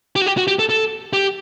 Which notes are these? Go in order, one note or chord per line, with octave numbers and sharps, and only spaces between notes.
G4
F#4
G4
F#4
G4
A4
A4
G4